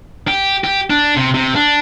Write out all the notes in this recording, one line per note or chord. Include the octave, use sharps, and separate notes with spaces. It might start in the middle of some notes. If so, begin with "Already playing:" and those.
G4
G4
D4
C3
C3
D4